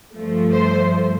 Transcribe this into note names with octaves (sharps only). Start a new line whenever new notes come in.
G2 F3 A3
C5